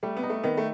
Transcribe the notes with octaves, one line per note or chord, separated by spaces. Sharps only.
G3 A3
B3
D#4
A3
D#3 B3
A3